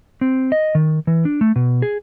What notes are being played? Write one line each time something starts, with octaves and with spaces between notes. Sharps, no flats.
C4
D#5
D#3
E3
D4
A3
B2
G#4